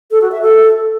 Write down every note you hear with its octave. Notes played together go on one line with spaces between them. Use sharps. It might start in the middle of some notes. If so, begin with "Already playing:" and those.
A4
F#4
E5
A4